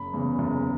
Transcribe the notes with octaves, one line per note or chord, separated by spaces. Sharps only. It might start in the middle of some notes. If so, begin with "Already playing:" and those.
Already playing: F#1 B5
E2 C#3
F#1